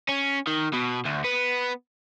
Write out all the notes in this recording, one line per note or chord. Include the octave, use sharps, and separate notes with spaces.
C#4
D#3
B2
D2
B3